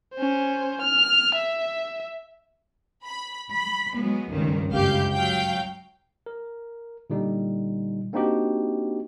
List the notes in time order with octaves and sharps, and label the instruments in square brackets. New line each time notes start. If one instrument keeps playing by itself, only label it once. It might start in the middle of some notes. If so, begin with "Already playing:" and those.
[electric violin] C#4 C5
F6
E5
[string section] B5
B5
F#3 G#3 B3
C#2 G2 D#3
G1 C#2 F#2 G4 F5 G6
F#3 F5 G5 G6
[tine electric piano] A#4
A#2 D3 G3 D#4
A#3 C4 D4 D#4 F#4 G4